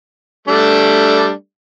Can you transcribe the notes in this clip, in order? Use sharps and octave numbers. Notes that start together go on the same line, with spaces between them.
G3 A3 D4